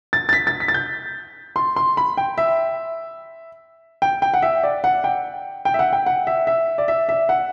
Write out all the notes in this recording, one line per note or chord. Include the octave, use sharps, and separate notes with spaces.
A6
A6
B6
A6
B6
A6
G6
C6
C6
B5
G5
E5
G5
G5
F#5
E5
D5
F#5
G5
G5
E5
F#5
G5
F#5
E5
E5
D5
E5
E5
F#5